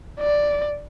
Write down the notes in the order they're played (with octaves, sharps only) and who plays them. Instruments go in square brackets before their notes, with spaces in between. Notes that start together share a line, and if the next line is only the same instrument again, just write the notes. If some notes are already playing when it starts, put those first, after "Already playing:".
[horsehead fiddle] D5